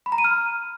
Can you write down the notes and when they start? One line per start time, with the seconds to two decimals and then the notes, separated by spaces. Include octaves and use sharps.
0.06 B5
0.12 A#5
0.18 D#7
0.24 F6